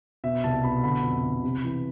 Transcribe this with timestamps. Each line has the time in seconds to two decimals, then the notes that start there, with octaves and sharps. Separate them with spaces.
0.24 B2 E5
0.44 C2 A5
0.63 B2 B5
0.83 D3 B5
1.04 F2
1.23 D3
1.43 C3
1.64 E3